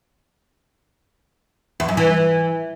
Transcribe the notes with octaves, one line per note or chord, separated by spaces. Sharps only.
E2
F#2
E3